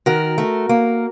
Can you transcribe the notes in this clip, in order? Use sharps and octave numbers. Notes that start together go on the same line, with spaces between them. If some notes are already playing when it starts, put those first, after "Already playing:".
D#3 F#4 A#4
A3
A#3